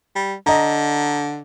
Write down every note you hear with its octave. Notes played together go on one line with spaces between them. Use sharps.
G3
D3 D#5 A#5